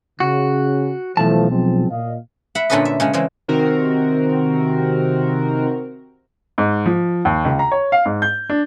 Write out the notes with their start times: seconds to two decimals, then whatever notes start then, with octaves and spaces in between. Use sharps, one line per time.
0.20 C#3 F#4
1.17 B1 E3 F3 A3 A5
1.51 F3 G#3 C4
1.91 A#2 D#5 F5
2.55 E5 F#5 B5
2.70 A#2 D3 C#4 A4 B4 D#5
2.85 E5
3.00 C#3 G#3 C#4
3.13 C#3 E3 G#3 C4
3.48 C3 D#3 C4 F#4 A#4
6.58 G#2
6.86 F3
7.25 D#2
7.45 C#2
7.59 A#5
7.72 C#5
7.92 F5
8.05 G#2
8.22 G6
8.49 D4